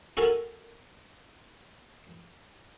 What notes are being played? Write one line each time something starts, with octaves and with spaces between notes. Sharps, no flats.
F#4 A4 A#4 G#5 A#5